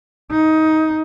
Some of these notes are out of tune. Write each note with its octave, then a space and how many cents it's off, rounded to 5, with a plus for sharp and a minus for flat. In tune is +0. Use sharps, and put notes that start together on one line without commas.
D#4 +15